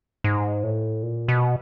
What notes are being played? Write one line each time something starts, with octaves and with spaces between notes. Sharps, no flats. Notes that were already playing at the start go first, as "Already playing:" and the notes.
G#2
A2
A#2
B2